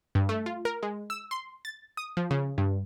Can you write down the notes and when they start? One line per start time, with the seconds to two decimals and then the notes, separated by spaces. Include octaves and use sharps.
0.15 G2
0.29 A3
0.46 F4
0.65 A#4
0.83 G#3
1.10 E6
1.31 C6
1.65 A6
1.97 D#6
2.17 F3
2.31 C#3
2.58 G2